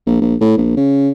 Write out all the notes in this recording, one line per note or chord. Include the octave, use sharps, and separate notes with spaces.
A#1
A#1
A2
A#1
C#3